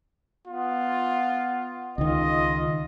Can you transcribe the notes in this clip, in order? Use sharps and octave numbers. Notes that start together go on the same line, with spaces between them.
B3 F4
C#2 D#3 F4 D#5